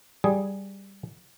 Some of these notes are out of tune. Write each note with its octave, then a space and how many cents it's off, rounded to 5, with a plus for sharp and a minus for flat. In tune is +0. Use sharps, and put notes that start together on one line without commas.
G3 +0 G#4 +0